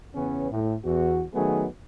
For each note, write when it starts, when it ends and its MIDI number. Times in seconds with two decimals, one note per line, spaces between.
0.14 0.50 40
0.14 0.50 49
0.14 0.50 52
0.14 0.50 59
0.14 0.50 61
0.51 0.75 45
0.85 1.23 40
0.85 1.23 66
1.34 1.65 51
1.34 1.65 54
1.34 1.65 57
1.34 1.65 59
1.34 1.65 63
1.34 1.65 68